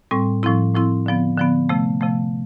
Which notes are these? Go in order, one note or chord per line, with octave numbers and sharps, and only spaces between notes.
A2 G3 C4
A2 F3 C4 E4
A2 F3 C4 E4
D3 F3 B3
D3 F3 B3
C3 F3 A3
C3 F3 A3